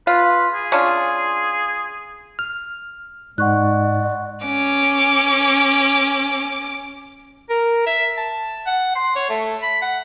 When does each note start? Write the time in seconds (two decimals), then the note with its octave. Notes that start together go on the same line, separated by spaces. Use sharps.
0.07 F4 B4
0.54 G#4
0.72 C#4 D4 F4
2.39 F6
3.38 G#2 G#3 D5 F#5 C#6 F#6
4.46 C#4 D6
7.50 A#4
7.87 E5
8.17 A5
8.66 F#5
8.95 C6
9.15 C#5
9.29 A3
9.63 B5
9.82 F#5